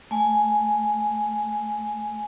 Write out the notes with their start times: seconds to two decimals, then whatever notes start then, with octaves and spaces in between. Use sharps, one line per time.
0.11 A3 G#5